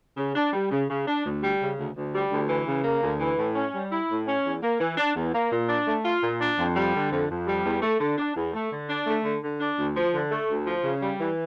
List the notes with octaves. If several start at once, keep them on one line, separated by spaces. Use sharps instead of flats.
C#3
D4
G3
C#3
C#3
D4
D2
G3
C#3
D2
D2
G3
D2
E3
C#3
A#3
D2
E3
A2
C#4
G3
E4
A2
C#4
E2
A#3
E3
D4
E2
A#3
A#2
D4
A3
F4
A#2
D4
F2
G3
D3
F2
F2
G3
E2
A3
D3
D4
E2
A3
D3
D4
A3
D3
D3
D4
D2
F3
D3
A3
D2
F3
C#3
G3
E3